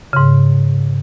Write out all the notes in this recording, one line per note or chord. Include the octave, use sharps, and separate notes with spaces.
G#2 C#3